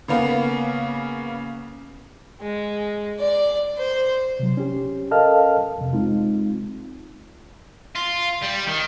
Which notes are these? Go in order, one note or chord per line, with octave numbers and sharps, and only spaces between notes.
C#3 A#3 B3
G#3
D5
C5
C3 F#3
C#4 G4
A4 A#4 D#5 F5 A5 F6
F2 C3
G#3 C4 D#4 F4
F4
G3
D#3